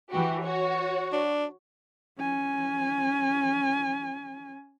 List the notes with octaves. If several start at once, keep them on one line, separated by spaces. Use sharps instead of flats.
E3 F#4 G4
F#4 C#5
D4
C#4 G#5